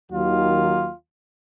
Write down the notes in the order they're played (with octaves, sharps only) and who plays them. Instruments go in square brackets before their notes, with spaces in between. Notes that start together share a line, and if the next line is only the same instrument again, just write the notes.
[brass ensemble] D#2 D#3 F#3 A#3 F4